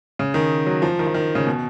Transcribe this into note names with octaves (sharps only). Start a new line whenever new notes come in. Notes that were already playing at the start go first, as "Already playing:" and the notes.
C#3
D#3
F#3
F3
D#3
F3
D#3
C#3
B2